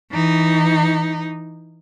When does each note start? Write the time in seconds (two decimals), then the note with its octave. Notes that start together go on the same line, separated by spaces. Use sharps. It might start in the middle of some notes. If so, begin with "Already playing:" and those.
0.12 E3 D#4